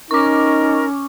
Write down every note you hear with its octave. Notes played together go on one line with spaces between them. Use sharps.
C#4 D#4 A#4 C#6 D6